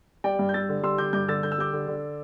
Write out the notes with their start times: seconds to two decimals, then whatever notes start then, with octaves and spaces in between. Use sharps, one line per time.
0.24 G3 D5 G5
0.39 G2
0.49 G6
0.54 G3 E6 A6
0.69 D3
0.83 G3 C6 E6
0.98 D3 D6 G6
1.13 G2 D6 G6
1.28 D3 E6 A6
1.43 D3 G6
1.52 E6
1.58 G3 D6 G6
1.73 D3
1.88 D3